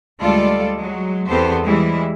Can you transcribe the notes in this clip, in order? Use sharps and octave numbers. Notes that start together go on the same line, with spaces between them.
D2 G3 G#3 F4 A4 D5
F#3 G#3
E2 B3 C4 G4 A4 C5
E3 G3 G#3 E4